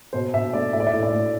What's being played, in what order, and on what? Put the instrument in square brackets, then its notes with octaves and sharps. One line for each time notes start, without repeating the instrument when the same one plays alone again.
[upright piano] B2 C5
B2 E5
A3 D5
A2 E5
D5
E5
A2
D5
A2